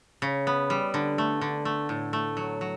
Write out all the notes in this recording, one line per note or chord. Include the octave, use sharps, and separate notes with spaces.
C#3
B3
G3
D3
A3
D3
A3
A2
A3
F#3
F#3